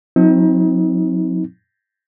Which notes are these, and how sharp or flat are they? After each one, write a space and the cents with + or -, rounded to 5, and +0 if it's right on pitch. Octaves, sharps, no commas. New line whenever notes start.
F#3 -45 C4 +0 D#4 +40